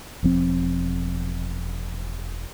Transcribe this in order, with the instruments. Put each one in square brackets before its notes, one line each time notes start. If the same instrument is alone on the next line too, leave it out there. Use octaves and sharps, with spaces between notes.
[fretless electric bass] E1 F3 C4